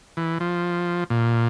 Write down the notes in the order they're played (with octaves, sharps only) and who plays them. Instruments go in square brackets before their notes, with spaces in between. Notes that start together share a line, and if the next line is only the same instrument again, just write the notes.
[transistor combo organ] E3
F3
A#2